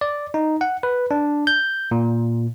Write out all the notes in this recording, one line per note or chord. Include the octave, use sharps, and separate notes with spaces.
D5
D#4
F#5
B4
D4
G6
A#2